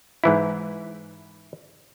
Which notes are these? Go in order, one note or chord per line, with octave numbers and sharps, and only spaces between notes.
G#2 E3 E4